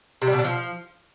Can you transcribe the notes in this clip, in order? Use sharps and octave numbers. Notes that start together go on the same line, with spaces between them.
C3
G3
B2
D3
F3